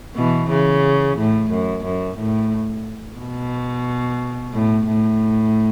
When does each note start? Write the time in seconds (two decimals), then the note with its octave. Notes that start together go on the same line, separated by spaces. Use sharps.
0.15 B2 E3
0.49 C#3
1.17 A2
1.50 F#2
1.84 F#2
2.18 A2
3.19 B2
4.53 A2
4.87 A2